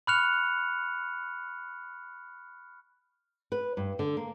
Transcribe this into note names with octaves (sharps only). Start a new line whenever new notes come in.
B5 C#6 F6 F#6 C#7 F7
B4
G2
D3
A#3